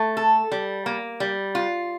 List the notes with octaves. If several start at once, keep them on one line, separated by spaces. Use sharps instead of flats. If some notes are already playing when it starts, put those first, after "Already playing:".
Already playing: A3
A4
G3
A#3
G3
F4